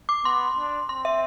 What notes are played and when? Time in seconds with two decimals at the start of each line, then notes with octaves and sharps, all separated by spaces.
0.09 D6
0.25 B3 C6
0.57 D4
0.89 C4 C6
1.05 E5